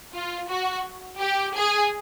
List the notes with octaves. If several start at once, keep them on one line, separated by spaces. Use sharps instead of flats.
F4
F#4
G4
G#4